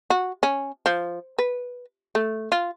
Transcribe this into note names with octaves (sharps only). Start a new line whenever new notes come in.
F#4
C#4
F3
B4
A3
F4